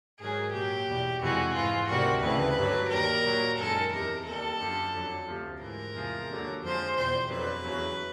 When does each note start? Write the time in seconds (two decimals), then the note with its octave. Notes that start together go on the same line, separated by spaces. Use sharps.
0.19 G#2 D#3 F#3 G#4
0.53 A#2 F#3 G4
0.87 E2 B2 G3
1.21 F2 C3 E3 G#3 F#4
1.54 G#2 E3 G#3 F4
1.89 D2 C3 D#3 G3 F#4
2.22 D2 C#3 E3 G3 B4
2.57 G2 D3 F#3
2.90 D#2 D#3 G3 A#4
3.24 A#2 F#3
3.58 F#2 D#3 G#3 A4
3.91 E2 C3 D#3 A#4
4.26 D#2 D#3 G3 A4
4.60 F#2 D3 F3
4.94 F2 D3 F#3
5.27 D2 C3 F3
5.61 G#2 E3 G#3 A#4
5.95 E2 C3 F3 G#3
6.29 D#2 D3 F#3
6.62 F2 D3 F3 G#3 C5
6.96 E2 B2 G3 C5
7.30 F2 D3 F#3 B4
7.64 E2 C#3 F#3